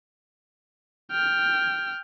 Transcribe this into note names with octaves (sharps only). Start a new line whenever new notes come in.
G5 F6